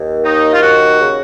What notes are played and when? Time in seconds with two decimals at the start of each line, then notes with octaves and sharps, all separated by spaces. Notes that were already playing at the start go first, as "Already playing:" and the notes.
Already playing: D#2
0.23 D#3 D#4
0.52 F4
0.61 D#2 F#4
0.99 C#3